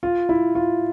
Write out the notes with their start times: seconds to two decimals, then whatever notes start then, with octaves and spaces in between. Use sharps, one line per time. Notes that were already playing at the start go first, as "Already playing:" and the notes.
0.03 F4
0.29 E4
0.55 F4